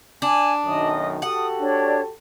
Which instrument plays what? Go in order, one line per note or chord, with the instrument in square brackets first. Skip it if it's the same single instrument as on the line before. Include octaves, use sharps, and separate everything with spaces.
[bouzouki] D4 [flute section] G#5
[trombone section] B1 F#2 D#3 [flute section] D#5 D#6
[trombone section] F#4 G4 A4 [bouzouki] F#5 [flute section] D#6
[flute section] D4 C#5 D5